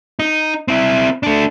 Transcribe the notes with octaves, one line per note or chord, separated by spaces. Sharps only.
D#4
C4 E4
A3 D4